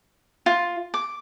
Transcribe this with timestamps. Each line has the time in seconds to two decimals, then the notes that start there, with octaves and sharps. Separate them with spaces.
0.46 F4
0.94 D6